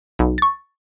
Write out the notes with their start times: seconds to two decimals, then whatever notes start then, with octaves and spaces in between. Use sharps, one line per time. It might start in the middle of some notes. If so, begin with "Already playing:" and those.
0.19 B1
0.38 C#6 A6